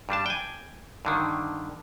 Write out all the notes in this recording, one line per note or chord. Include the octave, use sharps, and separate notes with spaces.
G2 G3 D4 A5
G5 G#5
G2 D3 D#3